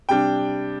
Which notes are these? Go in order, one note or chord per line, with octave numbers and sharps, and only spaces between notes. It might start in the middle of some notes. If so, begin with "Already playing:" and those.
C3 G3 D4 G5